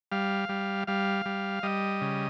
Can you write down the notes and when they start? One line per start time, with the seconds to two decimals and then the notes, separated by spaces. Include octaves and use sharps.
0.12 G3 F5
0.49 G3
0.87 G3 F5
1.26 G3
1.63 G3 D#5
2.01 C#3